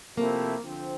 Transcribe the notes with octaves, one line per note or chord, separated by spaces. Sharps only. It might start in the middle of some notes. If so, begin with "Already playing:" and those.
C3 F3 A3 A#3 C4 E4
D3 F3 C4